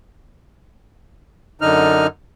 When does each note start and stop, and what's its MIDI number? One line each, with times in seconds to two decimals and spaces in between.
1.61 2.07 42
1.61 2.07 50
1.61 2.07 63
1.61 2.07 89